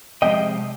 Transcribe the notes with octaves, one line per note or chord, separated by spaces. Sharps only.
C3 F3 G#3 D#5 G5